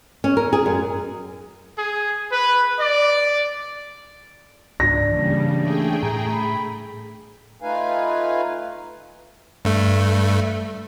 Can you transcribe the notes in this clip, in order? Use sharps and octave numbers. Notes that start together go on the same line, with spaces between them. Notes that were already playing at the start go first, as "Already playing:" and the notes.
C#4
A#4
G#4
F#2
G#4
B4
D5
C#2 G#2 D4 A#6
C#3 E3 G3 A#3
A3 G#4 G5
A2 A#5
B5
A3 D#4 F4 B4 F5 G#5
G2 A3